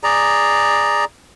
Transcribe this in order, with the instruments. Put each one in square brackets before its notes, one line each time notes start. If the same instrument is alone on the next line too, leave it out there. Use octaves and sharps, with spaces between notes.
[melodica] G#4 D5 A#5